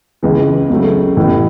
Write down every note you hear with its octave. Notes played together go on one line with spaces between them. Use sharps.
C#2 C#3 E3
C#2 C#3 F#3 A3
A1 A2 E3 B3